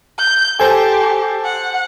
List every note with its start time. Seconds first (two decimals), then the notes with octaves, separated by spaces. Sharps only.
0.18 G6
0.60 G4 A4 C5 G#5 A5
1.45 F#5